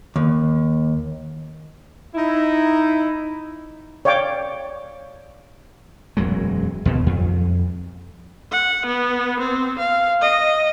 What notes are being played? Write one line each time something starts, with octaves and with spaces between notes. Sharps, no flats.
D#2
D#4 E4
C#5 D5 F5 G5 D6
E1 F#2 F#3 G#3
D#2 B2
F2
F#5
B3
C4
F5
D#5